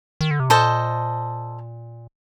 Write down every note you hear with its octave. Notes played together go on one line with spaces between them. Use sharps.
D#3
D3
C3
A#2 A4 C5 D#5 A5